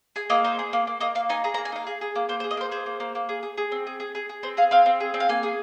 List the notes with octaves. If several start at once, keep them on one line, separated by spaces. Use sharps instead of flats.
G#4 G#5
A#3 D#5
D#4 C5
G#4
A#3
A#3
A#3 D#5
A#3 F5
D#4 G#5
G#4 A#5
A#5
A#3
G#5
D#4 F5
G#4
G#4
A#3
A#3 C5
C5
G#4
D#5
A#3 C5
G#4 C5
A#3
A#3
A#3
G#4
G#4
G#4
C4
G#4
G#4
G#4
G#4
C4 C5
G#4 F5
C4 F5
C4
G#4
C4
F5
A#3 G#5
G#4